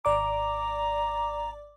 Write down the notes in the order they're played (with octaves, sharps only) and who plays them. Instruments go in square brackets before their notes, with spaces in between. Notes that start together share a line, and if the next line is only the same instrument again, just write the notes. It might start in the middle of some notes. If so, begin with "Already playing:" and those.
[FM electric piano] G#1 D5 D6 [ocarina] A#5